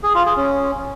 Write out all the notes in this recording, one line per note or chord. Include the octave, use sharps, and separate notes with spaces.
G#4
F4
G#4
C#4